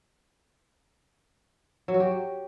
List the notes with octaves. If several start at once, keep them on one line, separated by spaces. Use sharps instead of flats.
F#3
F#4
G4